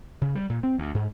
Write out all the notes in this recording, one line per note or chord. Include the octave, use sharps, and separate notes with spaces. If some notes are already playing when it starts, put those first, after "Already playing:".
C#3
G3
A#2
C4
D2
G#2